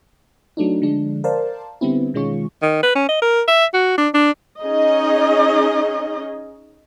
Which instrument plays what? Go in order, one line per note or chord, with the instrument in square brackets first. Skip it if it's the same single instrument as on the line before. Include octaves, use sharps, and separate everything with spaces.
[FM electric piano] F#3 A3 D4 D#4
D3 F3 G#3 D4
A#4 C5 D5 F5 A5
D3 G3 B3 C4 E4
B2 D#3 G#3 C#4 F4 C#6
[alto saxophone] D#3
B4
C#4
D#5
A#4
E5
F#4
D4
D4
[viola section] C#4 D#4 G#4 D#5